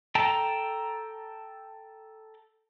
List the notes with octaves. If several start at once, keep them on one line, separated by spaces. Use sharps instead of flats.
A4 G5 A5 A#5